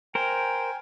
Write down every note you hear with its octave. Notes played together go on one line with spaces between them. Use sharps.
A#4 C5 G5 G#5